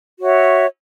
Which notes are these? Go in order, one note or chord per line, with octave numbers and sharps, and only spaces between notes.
F#4 C#5 E5